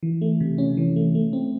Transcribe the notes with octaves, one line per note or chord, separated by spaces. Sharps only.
E3
A3
C3
C#4
E3
A3
A3
C4